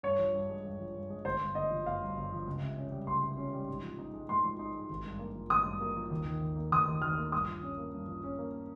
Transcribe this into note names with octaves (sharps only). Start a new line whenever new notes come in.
G2 C#5
F3
G2
G#3
G2
F3
G2
G#3
G1 C5
G2
G1 D#5
F3
G1 F5
G2
G1
F3
C#2
C3
C#4
G3
C#2 C6
C3
C#4
G3
G#2
F3
D#4
G#3
G#2 C6
F3
D#4
G#3
G#1
G2
A#3
F3
G#1 D#6
G2
A#3
F3
D#2
D#3
D#2
A#3
D#2 D#6
D#3
D#2 F6
A#3
G2 D#6
F3
C#4
A#3
G2
F3
C#4
A#3